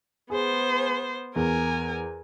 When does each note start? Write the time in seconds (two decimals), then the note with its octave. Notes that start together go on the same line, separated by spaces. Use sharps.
0.30 B3 G#4 C5
1.36 E2 A#4 G#5